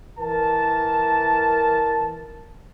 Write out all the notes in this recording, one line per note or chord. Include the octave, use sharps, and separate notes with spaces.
E3 A#4 A5